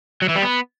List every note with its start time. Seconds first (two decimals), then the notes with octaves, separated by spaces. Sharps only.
0.22 F#3
0.29 E3
0.36 G3
0.43 B3